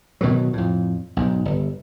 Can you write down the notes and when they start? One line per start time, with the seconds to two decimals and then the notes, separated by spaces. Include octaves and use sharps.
0.21 B2 D#3 E3 F#3
0.53 F2 A2
1.17 B1 G#2
1.45 G1